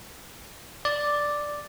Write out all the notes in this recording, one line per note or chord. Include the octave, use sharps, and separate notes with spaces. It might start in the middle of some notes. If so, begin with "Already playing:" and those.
D5